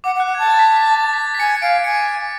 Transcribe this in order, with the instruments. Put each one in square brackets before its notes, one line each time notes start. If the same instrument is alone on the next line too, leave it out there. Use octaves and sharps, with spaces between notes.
[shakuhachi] F#5 [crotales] D6
[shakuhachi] F#5
[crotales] F#6
[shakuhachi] F#5
[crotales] G#6
[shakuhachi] A5
[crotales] A6
B6
A6
B6
A6
B6
A6
B6
A6
B6
[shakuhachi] G#5 [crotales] C#7
[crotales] C#7
[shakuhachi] F5 [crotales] D7
[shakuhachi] G#5 [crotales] C#7